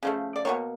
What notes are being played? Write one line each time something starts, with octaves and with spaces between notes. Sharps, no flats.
C#3 F3 A3
D5
B2 G3 A#3 C#5